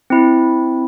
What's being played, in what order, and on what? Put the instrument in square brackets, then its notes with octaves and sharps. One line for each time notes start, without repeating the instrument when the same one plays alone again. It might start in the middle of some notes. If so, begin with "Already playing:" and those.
[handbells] C4 E4